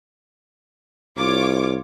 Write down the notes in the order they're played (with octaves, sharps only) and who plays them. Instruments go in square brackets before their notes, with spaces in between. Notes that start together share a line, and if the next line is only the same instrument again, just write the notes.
[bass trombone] C2 [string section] F4 C#5 D6